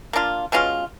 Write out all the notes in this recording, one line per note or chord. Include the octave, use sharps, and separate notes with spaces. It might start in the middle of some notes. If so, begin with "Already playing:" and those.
A#3 D4 F4
B2 G#3 C#4 F4